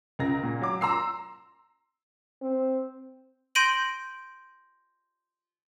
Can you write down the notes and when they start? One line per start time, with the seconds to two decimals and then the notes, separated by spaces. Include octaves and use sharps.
0.19 C#2 A#4 A#6
0.43 A#2
0.61 F#3 D6
0.81 A#5 C6 E6 C7
2.42 C4
3.55 C6 G6 A#6 D7 D#7 F#7